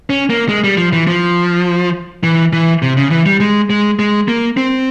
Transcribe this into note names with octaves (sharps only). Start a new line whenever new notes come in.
C#4
A#3
G#3
G3
F3
E3
F3
E3
E3
C3
C#3
E3
G3
G#3
G#3
G#3
A#3
C4